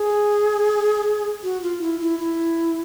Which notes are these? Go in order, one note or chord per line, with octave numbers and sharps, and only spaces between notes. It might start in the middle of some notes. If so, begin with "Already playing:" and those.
Already playing: G#4
F#4
F4
E4
E4
E4